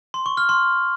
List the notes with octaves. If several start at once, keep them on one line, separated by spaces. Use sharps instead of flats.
C6
C#6
F6
C6